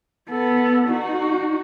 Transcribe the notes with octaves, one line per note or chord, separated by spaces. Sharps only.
B3 A4
D#4 F#4